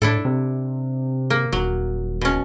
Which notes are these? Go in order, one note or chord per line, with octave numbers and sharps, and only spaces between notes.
A2 D4 E4 A4
C3
A#3
D#1 F#3
B2 C#4